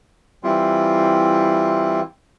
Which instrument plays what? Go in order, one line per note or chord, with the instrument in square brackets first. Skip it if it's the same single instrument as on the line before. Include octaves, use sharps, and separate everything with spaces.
[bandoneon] E3 G3 C4 E4 F4